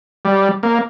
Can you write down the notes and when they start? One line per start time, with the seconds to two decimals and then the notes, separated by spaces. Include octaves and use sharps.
0.25 G3
0.63 A#3